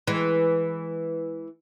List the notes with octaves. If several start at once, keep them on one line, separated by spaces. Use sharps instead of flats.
E3 G#3